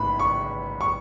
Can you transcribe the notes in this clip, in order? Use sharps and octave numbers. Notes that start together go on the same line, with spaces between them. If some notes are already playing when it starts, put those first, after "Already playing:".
Already playing: A1 G#2 E3 G#3 B3 B5
C#6
C#6